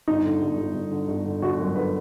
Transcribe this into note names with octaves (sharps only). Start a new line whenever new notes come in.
G1 D#4
D3
G1
G1
G1
D3
G1
D3
G1 F#4
F#2
D3 B4